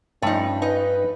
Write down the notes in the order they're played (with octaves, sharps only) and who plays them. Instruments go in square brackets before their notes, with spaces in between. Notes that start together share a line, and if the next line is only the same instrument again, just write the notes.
[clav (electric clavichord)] G2 F3 [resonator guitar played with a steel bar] A3 D#4 [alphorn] C#4
[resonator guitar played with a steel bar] D#4 D#5 [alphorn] B4